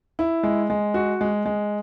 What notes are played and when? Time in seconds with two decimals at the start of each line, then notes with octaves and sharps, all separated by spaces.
0.19 E4
0.43 G#3
0.70 G#3
0.94 F#4
1.21 G#3
1.46 G#3